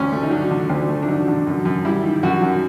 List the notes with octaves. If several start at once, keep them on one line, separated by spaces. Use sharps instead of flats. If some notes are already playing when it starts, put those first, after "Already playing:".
Already playing: D2 C#4
A3
D#4
F#3 D4
D3
D2
A3
D4
F#3 D#4
D3
F#2
F#2
G3 E4
D#3
F#2 F#4
F#2